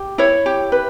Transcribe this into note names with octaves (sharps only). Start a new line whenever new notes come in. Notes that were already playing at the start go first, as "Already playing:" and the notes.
Already playing: G4
E4 C#5
G4
B4